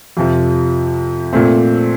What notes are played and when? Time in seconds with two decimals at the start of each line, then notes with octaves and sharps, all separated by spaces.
0.17 F2 C3 F3
1.33 A#2 A3 C4